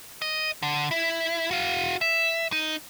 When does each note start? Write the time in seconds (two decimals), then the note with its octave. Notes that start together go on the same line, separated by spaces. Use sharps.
0.22 D#5
0.62 D3
0.91 E4
1.51 F#4 F5
2.01 E5
2.52 D#4